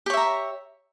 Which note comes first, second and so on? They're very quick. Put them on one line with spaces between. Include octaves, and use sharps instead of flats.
G4 C#5 E5 A#5